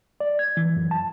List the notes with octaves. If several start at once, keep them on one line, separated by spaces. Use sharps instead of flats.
D5
G#6
E3
F#2
A5